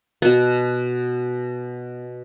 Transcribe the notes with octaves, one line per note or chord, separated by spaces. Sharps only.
B2 B3